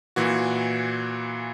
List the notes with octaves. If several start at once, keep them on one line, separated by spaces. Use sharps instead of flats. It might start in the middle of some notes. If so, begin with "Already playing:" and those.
A#2 E3 F#4